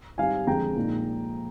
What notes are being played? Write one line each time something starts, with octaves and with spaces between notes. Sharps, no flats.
G#2 G3 C4 D#4 F5 G#5
F2 D3 G#3 G5 A#5
A#1 A#2 G#3 D#4